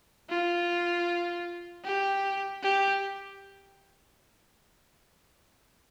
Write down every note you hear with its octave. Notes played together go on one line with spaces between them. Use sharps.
F4
G4
G4